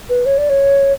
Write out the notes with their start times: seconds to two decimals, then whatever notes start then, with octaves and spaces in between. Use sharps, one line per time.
0.10 B4
0.26 C#5
0.38 D5
0.50 C#5